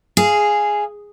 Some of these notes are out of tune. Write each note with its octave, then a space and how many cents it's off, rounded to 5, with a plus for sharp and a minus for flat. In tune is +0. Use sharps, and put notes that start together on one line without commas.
G#4 +0 F5 -25